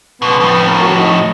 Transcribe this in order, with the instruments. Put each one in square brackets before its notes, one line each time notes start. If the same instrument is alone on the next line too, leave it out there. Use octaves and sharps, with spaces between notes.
[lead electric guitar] C#2 B2 [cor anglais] B3
[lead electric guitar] F2 A2
[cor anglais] A#4
F#4
D#4